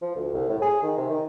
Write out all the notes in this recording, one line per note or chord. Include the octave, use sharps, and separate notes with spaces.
F3
D2
C2
A2
G#4
D#3
C3
D#3